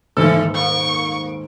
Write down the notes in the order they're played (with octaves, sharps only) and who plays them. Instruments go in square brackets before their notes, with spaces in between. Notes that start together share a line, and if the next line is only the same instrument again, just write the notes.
[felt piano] D#1 G#2 E6 [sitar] D3 E3 A4
[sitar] A#3 [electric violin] C#6